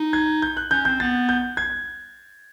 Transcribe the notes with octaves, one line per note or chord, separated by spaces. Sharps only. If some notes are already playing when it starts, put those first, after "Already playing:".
Already playing: D#4
G#6
G6
F#6
C#4 G6
C4 G6
B3 A6
G6
G#6